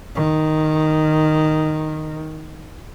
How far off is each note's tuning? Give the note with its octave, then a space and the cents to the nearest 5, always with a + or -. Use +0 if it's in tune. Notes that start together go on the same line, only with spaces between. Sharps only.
D#3 -5